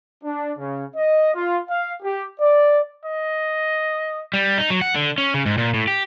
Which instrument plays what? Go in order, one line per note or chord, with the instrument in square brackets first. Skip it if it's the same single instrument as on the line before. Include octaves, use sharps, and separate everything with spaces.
[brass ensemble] D4
C#3
D#5
F4
F5
G4
D5
[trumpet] D#5
[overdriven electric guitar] G3
D#4
F#3
F#5
D3
C#4
C#3
G#2
A#2
A2
G4